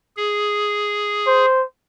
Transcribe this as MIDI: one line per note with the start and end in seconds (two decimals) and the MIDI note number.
0.16 1.45 68
1.26 1.64 72